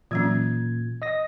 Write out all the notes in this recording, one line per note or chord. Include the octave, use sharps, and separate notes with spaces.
A#2 E3 F#3 C#4 G#6
D#5 D#6 A#6